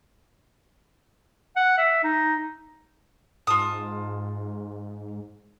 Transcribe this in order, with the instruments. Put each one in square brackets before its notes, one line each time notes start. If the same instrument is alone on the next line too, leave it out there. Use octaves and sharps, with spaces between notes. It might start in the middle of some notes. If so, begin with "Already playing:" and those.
[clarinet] F#5
E5
D#4
[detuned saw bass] G#2 [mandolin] F4 A5 D#6